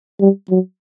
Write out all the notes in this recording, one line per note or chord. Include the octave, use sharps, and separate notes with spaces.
G3
F#3